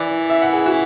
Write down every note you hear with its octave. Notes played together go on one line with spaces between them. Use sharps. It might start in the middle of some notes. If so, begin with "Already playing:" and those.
Already playing: E3 D5
E5
F#5
G#4
F#4